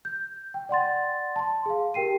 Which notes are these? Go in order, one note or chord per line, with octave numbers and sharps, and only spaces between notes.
G6
G5
D5 F#5 C6 A6
A5 C6
G#4 F5
G4 A#4 G5 C7 D#7